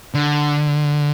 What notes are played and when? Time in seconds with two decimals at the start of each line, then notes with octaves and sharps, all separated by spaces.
0.14 D3